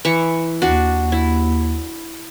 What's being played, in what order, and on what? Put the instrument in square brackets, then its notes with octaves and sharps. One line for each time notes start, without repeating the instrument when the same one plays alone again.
[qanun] E3 C#6
[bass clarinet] D#2 [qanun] D4 F#4
[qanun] E4